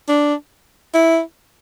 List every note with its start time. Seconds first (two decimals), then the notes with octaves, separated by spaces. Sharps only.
0.08 D4
0.94 E4